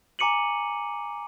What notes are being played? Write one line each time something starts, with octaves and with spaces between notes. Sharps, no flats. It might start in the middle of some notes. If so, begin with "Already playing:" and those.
G#5 A#5 D6 C#7 D#7 F#7